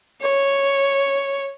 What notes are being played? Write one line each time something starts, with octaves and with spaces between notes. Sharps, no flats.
C#5